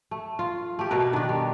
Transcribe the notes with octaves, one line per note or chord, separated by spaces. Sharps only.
A3
F4
A3 G4
B2 A3 A#4 B4
D#3 D4
G3